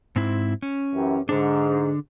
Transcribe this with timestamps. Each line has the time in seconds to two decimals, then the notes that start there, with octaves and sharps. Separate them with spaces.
0.16 G#2 C4 E4
0.62 C#4
0.94 F#2 E3 G4
1.29 G#2 D3 D4